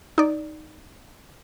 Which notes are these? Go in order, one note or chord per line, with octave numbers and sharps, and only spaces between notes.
D#4 D5